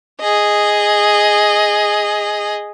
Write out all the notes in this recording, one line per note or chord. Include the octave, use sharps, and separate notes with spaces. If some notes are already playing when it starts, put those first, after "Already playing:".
G#4 D#5